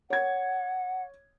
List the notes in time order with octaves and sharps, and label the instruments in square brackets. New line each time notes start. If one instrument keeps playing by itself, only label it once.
[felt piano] C#5 G#6 [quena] F#5